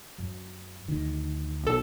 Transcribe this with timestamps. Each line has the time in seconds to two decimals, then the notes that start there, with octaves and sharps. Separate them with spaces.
0.18 F#2 F#3
0.88 D2 D#3
1.64 B1 A4